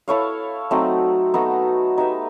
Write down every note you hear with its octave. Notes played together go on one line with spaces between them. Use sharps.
E4 A4 C#5 F5
F#3 A3 C4 D#4
B3 D#4 F#4 A4
D#4 G4 B4 E5